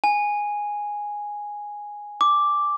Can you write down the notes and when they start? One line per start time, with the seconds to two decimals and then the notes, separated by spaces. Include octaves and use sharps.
0.04 G#5
2.21 D6